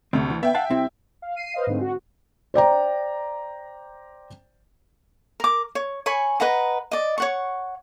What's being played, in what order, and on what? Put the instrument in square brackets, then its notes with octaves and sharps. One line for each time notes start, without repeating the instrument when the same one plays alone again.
[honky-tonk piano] D2 [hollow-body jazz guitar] C3 A3 C4
[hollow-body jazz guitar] E3
[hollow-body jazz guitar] B3 [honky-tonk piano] E5 G5
[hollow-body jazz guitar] F5 F#5 A5
C2 C4 E4
[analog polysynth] F5
C7 D#7
B4 C5 D#5 F5
G#2 D3 G#3 A3 C4
F#4
[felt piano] C5 D5 G5 A#5
[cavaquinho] A#4 D6
C#5
C#5 G#5 B5 C#6
B4 D#5 F#5 A#5
D5 D#5
C#5 F#5 C#6